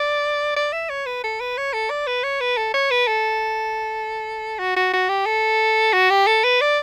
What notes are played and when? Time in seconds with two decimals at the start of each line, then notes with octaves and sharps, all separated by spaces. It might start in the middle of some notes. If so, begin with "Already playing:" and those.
Already playing: D5
0.56 D5
0.73 E5
0.90 C#5
1.06 B4
1.24 A4
1.40 B4
1.57 C#5
1.73 A4
1.90 D5
2.07 B4
2.23 C#5
2.41 B4
2.57 A4
2.74 C#5
2.91 B4
3.07 A4
4.59 F#4
4.76 F#4
4.93 F#4
5.09 G4
5.26 A4
5.93 F#4
6.10 G4
6.27 A4
6.44 B4
6.61 D5